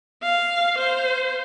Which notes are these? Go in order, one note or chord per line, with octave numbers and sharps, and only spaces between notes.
F5
C5